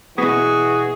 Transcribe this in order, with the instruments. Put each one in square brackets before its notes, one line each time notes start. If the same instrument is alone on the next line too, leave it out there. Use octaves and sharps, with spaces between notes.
[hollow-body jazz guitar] B2 B3 [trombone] E3 [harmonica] F#4 [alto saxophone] G#4